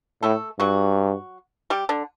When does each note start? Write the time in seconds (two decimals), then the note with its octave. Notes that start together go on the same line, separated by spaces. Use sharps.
0.23 A2 A3 A4
0.59 G2 F#3 F#4
1.70 G3 G4
1.89 D3 D4